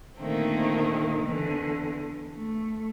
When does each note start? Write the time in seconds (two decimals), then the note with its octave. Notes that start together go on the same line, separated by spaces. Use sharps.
0.18 A#2 D3 D#3 A3 A#3 C4
1.23 E2 D3 E3
2.35 A3